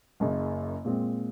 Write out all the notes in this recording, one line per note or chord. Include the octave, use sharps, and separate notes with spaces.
F#1 F#2 C#3
A#2 G#3 C4